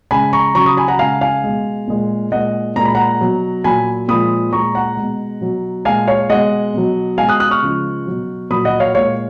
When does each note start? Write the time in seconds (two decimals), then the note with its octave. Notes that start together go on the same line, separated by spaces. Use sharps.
0.11 C#3 G#3 G#5 B5
0.33 A#5 C#6
0.55 C#3 F#3 A#5 C#6
0.66 B5 D#6
0.77 G#5 B5
0.88 F#5 A#5
0.99 C#3 G#3 F5 G#5
1.21 F5 G#5
1.44 B2 G#3
1.88 A#2 G#3
2.32 A#2 G#3 D#5 F#5
2.76 A#2 G#3 A#5
2.85 B5
2.95 F#5 A#5
3.20 B2 F#3
3.64 A#2 F#3 G#5 B5
4.08 A#2 F3 G#3 B5 D#6
4.53 A#2 G#3 A#5 C#6
4.75 F#5 A#5
4.97 B2 G#3
5.41 B2 F#3
5.85 A#2 G#3 F5 G#5
6.07 C#5 F5
6.30 B2 G#3 D#5 F#5
6.74 B2 F#3
7.18 B2 G#3 F5 G#5
7.29 D#6 F#6
7.40 D#6 F#6
7.51 C#6 F6
7.62 C#3 F3 G#3
8.07 B2 F#3
8.50 A#2 F#3 B5 D#6
8.65 D#5 F#5
8.80 C#5 F5
8.95 A#2 G#3 C#5 F5